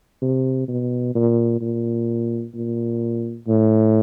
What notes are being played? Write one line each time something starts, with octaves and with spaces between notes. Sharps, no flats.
C3
B2
A#2
A#2
A#2
A2